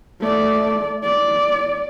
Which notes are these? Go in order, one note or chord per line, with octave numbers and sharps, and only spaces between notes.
A3 D5
D5